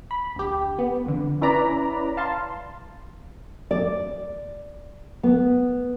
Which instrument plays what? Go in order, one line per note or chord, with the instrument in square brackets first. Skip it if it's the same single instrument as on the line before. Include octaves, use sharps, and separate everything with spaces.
[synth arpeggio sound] B5
D2 G4
B3
F2 D3
C#4 E4 B4 D5 A#5 B5
F5 A5 C6
[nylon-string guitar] D5
B3